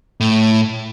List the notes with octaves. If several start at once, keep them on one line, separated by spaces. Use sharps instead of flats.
A2